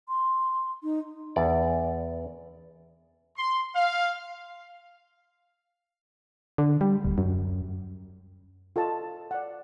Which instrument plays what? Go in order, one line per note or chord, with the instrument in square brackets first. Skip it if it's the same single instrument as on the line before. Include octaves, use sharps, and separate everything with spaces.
[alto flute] C6
D#4
[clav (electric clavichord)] E2 D5
[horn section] C6
F5
[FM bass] D3
G3
D1
F#2
[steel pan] F4 A4 D#5 A5
D5 F#5